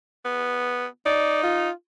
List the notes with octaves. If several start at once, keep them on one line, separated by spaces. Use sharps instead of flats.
B3
D#4 D5
F4